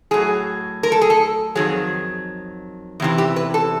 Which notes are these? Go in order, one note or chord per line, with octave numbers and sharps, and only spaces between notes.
A2 F#3 G#4
A#4
A4
G#4
A4
F2 C3 D#3 F#3 G#4
E2 C3 E3
G4
B4
A4